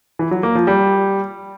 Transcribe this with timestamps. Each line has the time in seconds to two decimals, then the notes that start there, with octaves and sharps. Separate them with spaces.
0.19 E3
0.31 F#3
0.43 A#3
0.55 F3
0.67 G3